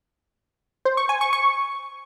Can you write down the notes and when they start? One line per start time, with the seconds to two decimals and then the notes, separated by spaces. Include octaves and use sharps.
0.85 C5
0.97 C#6
1.09 G#5
1.21 C#6
1.33 C#6